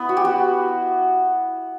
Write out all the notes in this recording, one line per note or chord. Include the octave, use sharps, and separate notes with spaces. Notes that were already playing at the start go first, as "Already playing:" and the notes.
Already playing: B3 E4
F#4
G4
F#4